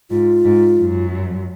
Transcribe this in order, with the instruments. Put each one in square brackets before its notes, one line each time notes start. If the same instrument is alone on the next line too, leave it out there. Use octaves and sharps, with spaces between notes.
[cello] G#2 [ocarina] F4
[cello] G#2
F#2